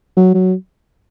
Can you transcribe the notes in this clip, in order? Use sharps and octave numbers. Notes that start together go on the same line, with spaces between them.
F#3
F#3